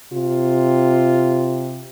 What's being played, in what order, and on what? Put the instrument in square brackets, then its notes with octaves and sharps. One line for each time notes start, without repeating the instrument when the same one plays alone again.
[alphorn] C3 [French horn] F4